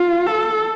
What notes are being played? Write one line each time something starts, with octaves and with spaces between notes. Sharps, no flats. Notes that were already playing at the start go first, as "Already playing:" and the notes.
Already playing: F4
A4